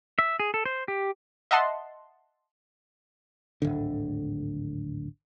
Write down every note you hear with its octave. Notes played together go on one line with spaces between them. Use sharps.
E5
G#4
A4
C5
G4
D#5 E5 F#5 A5 C6
D1 G#1 D3